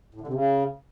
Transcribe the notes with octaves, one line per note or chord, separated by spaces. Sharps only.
A2
D3
C3
C#3